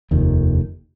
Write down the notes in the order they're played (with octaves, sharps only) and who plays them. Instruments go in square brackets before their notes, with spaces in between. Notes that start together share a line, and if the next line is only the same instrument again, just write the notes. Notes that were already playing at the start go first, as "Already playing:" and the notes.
[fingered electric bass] F1 D#2 D#3